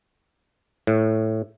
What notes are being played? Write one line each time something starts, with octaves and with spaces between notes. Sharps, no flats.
A2